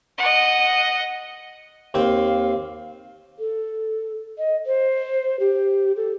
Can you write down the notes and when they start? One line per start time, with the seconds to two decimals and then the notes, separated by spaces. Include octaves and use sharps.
0.18 D#5 F#5
1.94 D#2 C4 F5 G5
3.39 A4
4.38 D#5
4.66 C5
5.40 G4
5.97 A4